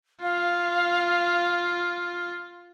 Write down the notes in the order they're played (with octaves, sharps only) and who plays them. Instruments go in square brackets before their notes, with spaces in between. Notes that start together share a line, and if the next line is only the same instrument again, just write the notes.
[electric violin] F4 [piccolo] F5